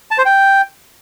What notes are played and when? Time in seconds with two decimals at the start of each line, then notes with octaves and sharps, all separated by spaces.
0.11 A5
0.18 C5
0.25 G5